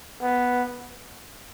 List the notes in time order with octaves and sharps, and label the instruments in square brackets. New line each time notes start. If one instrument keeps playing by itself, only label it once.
[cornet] B3